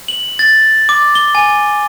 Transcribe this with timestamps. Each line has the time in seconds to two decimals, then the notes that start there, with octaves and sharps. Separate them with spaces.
0.08 F#7
0.39 A6
0.89 D6
1.15 G7
1.35 G#5